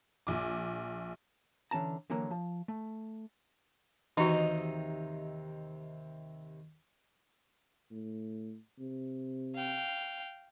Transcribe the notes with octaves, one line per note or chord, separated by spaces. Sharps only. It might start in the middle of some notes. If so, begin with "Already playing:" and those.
A#1 D6
D3 E3 C#4 A5 A#5
D3 E3 F#3 A#3 A#4
F3
A3
D#2 C3 E3 C4 D#4 F#4
A2
C3
F5 G5